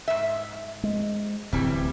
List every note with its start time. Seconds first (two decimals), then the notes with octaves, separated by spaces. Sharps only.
0.08 G#2 E5
0.83 G#3
1.53 D1 E3 G3 C4